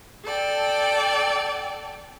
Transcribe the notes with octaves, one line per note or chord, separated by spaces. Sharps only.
A4 D5 G5